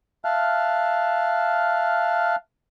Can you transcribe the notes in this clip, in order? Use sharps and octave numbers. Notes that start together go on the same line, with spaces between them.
E5 F5 A5 F6 F#6